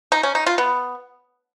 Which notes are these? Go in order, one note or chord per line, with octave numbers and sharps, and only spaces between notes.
D#4
C#4
D#4
F4
B3